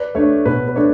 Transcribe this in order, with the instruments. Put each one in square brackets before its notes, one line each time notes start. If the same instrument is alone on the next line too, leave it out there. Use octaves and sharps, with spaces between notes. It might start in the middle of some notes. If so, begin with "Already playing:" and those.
Already playing: [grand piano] B4 D5
[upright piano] A3 D4 [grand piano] C#5
[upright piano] B2 [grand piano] B4
[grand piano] B4
[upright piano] A3 D4 [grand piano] C#5